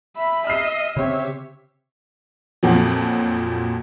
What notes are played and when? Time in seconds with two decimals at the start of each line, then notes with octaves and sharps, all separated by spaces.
0.17 E5 B5
0.47 D#5 F6 C7
0.97 C#3 C4 G4 C#5 E5
2.63 F2 A#2 F3 F#3